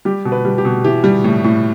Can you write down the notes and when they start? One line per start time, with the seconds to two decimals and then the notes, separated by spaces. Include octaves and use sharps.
0.05 G3 G4
0.25 B2
0.32 B4
0.45 G3
0.58 G4
0.65 B2
0.84 E3 G4
1.04 G3
1.24 A2
1.44 A2